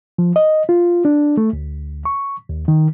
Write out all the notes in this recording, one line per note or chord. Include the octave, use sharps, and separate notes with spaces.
F3
D#5
F4
D4
A3
D2
C#6
D#2
D#3